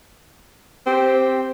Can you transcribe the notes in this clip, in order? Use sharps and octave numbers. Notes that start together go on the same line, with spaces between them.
C4 G4